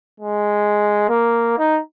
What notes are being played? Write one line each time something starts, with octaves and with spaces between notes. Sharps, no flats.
G#3
A#3
D#4